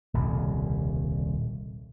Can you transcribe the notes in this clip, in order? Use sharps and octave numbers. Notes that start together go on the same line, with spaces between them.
D#1 C2 C#3